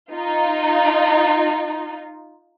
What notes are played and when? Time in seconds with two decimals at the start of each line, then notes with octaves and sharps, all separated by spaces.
0.12 D#4 F4